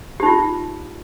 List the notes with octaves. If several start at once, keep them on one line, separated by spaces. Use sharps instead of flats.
D#4 F4 G4